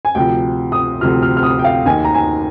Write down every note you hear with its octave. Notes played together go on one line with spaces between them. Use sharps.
G#5
D2 C3 F3 G5
D#6
D2 C3 F3 F6
F6
F6
D#6
G5
F5
D#2 D#3 G#5
A#5
G#5